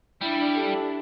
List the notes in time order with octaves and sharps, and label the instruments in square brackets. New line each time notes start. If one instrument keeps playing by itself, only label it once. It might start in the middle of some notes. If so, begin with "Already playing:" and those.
[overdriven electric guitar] G3 [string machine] D4 [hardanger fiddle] E4
[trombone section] G4 A4